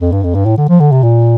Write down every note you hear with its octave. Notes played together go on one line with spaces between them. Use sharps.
F2
G2
F2
G2
A2
D3
F3
D3
C3
A#2